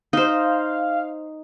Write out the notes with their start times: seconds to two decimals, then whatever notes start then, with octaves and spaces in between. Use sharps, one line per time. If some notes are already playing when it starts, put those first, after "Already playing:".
0.13 D#4 C5 F5